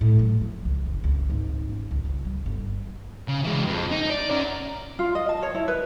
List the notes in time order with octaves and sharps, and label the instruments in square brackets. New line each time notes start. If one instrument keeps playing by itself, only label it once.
[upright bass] A2
F#3
F3
C#2
F#1
C#2
G#1
C#4
C#2
C#2
G3
G1
[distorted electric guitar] C#3
E3 G#3
F2
D#4
D5
C#4 A#4
[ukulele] F4
D#5
A5
C#5
E4
B4